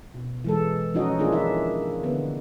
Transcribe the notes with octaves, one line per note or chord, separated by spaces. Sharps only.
B2
E3 G#3 A4
F3 C#4 D#4 F#4 D#5
D#3 A#3 D4 F4 G#4
E4 E5
D3 B3